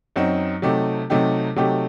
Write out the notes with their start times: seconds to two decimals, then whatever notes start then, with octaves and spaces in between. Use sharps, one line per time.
0.16 F#2 F#3 C4 D#4
0.62 C3 F#3 A3 D#4 G4
1.10 C3 F#3 A3 D#4 G4
1.56 C3 F#3 A3 D#4 G4